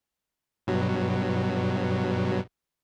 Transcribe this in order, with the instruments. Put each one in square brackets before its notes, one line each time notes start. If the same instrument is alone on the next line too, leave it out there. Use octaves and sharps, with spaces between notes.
[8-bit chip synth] G2 B2 F#3